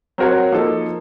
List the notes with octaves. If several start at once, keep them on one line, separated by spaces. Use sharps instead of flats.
F#3 C4 F#4 A#4 C#5
F3 A#3 D#4 A4